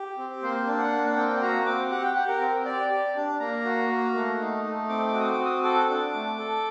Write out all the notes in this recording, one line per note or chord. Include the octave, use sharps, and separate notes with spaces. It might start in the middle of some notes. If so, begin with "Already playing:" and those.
Already playing: G4
C4
A#3 C5
D4
F#5
A#3
C4 G5
F#4 A#5
C4 D6
G4 F#5
G5
G4 F#5
A#4
C4
G4 D5
G4
D4
A#3 A#5
F#4
A#3
A3
D#4
A3
C4 D6
D6
F#4
D#6
D6
C4
D#6
A4 D6
D4
A3
A4